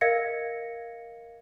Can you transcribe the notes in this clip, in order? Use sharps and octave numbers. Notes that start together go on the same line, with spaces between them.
A#4 D#5 F5 G#6 A#6 C#7